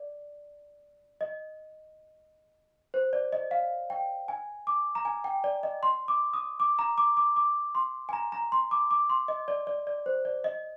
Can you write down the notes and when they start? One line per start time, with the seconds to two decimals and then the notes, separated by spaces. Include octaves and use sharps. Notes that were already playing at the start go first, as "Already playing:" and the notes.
Already playing: D5
1.21 D#5
2.94 C5
3.13 D5
3.33 D#5
3.51 F5
3.90 G5
4.28 G#5
4.67 D6
4.95 A#5
5.05 G#5
5.24 G5
5.44 D5
5.63 D#5
5.83 C6
6.08 D6
6.33 D#6
6.60 D6
6.79 A#5
6.98 D6
7.17 D6
7.36 D6
7.75 C6
8.09 G#5
8.13 A#5
8.32 A#5
8.52 C6
8.71 D6
8.91 D6
9.10 C6
9.28 D#5
9.48 D5
9.67 D5
9.87 D5
10.06 C5
10.25 D5
10.44 D#5